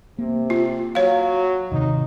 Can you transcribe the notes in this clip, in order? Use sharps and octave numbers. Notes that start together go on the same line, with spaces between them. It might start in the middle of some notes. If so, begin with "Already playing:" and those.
C3 A#3
F4
F#3 C#5 F5
G#2 C3 D#3 D#4